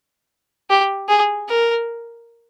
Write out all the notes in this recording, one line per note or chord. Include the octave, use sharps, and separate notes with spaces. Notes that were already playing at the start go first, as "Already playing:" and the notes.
G4
G#4
A#4